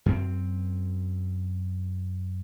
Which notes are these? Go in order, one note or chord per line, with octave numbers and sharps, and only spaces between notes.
F#2 C4